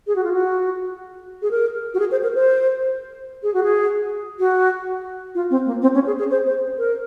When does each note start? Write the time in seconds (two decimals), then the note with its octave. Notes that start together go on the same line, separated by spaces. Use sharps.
0.07 G#4
0.16 F#4
0.24 F4
0.33 F#4
1.42 G#4
1.51 A#4
1.94 F#4
1.99 G#4
2.11 C5
2.23 A#4
2.35 C5
3.43 G#4
3.54 F#4
3.63 G#4
4.39 F#4
5.35 F4
5.50 C4
5.66 A#3
5.82 C4
5.95 C#4
6.07 G#4
6.19 G#4
6.31 C5
6.46 C5
6.79 A#4